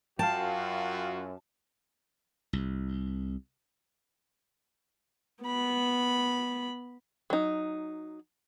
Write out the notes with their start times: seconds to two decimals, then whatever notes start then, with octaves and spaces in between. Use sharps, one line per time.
0.19 F#2 F4 F#4 F5 G5 A5
2.53 C2
5.44 B3 B5
7.30 F#3 D#4